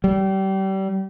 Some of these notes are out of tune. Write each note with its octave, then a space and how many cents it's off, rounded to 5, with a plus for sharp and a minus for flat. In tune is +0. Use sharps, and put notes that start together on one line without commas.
G3 -30